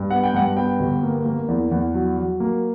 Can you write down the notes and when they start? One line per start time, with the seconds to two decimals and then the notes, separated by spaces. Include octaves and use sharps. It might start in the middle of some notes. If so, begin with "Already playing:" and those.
Already playing: G2
0.10 B3 F#5
0.23 G5
0.34 G2 F#5
0.57 B3 G5
0.80 G1
1.03 A#3
1.26 A#3
1.48 E2
1.71 E2
1.94 F#3
2.17 F#3
2.40 A#3